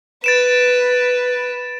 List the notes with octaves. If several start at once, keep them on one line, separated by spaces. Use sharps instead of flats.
B4 A6 D7 E7